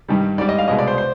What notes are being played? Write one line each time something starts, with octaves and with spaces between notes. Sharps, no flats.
G2 D#3 G3
G#2 G3 D5
D#5
F5
C2 B2 G#3 D#5
D5
C5
C5